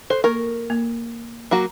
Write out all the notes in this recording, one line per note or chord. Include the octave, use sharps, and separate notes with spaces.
A4 C5
A#3 A#4 C#6
A#3
F#3 A#3 F#4 A#5